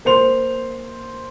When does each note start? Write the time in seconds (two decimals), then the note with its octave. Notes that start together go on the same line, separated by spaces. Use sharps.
0.05 A#3 C5 C6 F7